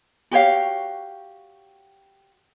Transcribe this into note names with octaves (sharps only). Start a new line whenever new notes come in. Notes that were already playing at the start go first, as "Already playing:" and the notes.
F#4 G4 C#5 F5